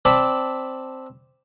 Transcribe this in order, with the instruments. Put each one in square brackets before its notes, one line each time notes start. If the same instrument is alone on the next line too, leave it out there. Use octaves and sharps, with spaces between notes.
[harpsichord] C4 D5 A5 B5